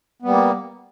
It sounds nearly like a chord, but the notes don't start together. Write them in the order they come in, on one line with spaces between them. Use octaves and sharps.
B3 G3 A#3